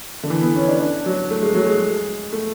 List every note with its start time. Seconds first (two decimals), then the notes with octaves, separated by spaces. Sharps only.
0.23 D3
0.30 E3
0.42 B3
0.56 C#4
0.68 D4
0.80 D4
1.06 F#3
1.31 A3
1.42 G#3
1.55 F#3
1.66 G#3
2.33 A3